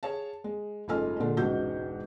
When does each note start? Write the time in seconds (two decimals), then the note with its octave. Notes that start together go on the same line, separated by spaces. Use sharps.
0.03 G#4 C#5 F5 A5
0.44 G#3
0.88 F#1 G#2 A3 F4 G#5 F6
1.20 A#2 D3 G#3 A#3 D4 F4
1.37 E1 C#2 G#2 F#4 G6